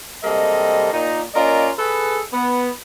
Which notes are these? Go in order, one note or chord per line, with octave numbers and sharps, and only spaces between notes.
C3 G3 G#3 A#3 A4 D#5
A#2 D#4
A#3 C#4 F4 A#4 D5 D#5
G#4 A4 B4
B3